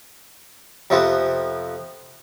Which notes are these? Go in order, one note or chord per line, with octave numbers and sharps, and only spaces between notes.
F2 C3 F3 B3